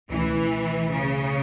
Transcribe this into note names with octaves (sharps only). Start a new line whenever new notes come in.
C#2 B2 E3 A3 C#4
C#3